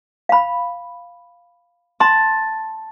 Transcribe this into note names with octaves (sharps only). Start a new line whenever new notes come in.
F5 B5
A5 C6